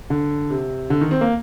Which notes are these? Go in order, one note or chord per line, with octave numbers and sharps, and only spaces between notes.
D3
C3
D3
D#3
C4
A#3